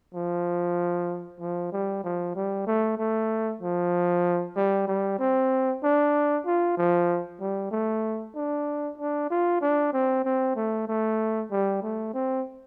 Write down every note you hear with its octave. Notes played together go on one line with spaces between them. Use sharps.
F3
F3
G3
F3
G3
A3
A3
F3
G3
G3
C4
D4
F4
F3
G3
A3
D4
D4
F4
D4
C4
C4
A3
A3
G3
A3
C4